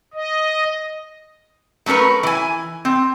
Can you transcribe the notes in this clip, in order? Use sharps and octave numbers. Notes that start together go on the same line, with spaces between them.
D#5
F#3 A3 C#4 A#4 B4
E3 G#5
C4